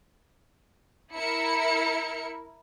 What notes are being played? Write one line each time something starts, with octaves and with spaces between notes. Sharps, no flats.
E4 A#4 C#7